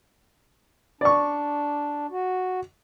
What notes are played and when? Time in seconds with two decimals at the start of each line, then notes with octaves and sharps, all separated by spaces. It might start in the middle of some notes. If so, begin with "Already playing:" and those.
1.01 D4 D5 C#6
2.11 F#4